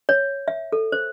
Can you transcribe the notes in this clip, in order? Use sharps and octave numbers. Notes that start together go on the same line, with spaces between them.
C#5
E5
A4
C5